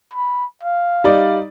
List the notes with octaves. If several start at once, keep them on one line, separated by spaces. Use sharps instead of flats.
B5
F5
G3 D#4 D5